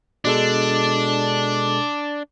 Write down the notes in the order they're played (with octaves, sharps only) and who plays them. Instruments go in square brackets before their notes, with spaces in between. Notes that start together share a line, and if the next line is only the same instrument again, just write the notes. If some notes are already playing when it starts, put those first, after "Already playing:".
[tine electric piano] B2 G#3 A4 [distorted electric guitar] D4